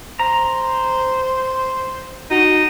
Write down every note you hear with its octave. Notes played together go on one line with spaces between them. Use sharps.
C5 A#5
D#4 F#4